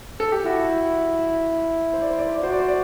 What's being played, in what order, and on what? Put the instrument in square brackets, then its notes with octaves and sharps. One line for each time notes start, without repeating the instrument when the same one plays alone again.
[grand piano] A4
G4
[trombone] E4 [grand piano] F#4
[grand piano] C5
D5
C5
D5
C5
D5
[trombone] F#4 [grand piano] C5
[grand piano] D5
C5
D5